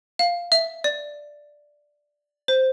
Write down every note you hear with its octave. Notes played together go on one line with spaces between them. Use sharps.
F5
E5
D5
C5